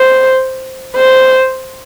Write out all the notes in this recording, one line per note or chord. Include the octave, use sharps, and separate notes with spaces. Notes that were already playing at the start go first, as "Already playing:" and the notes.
Already playing: C5
C5